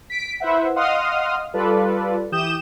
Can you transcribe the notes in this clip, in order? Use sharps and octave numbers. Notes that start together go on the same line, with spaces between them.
B6 D7
E4 B4 C5 E5 F#5
D#5 F5 F#5 C6 D#6 F6
G3 F4 A4 B4 D5
E3 G4 D#6 G6 E7